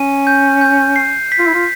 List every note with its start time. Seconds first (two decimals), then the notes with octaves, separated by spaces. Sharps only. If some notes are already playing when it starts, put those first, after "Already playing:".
Already playing: C#4 D#7
0.27 G6
0.61 G6
0.96 C7
1.32 B6
1.39 F4
1.47 E4
1.54 F4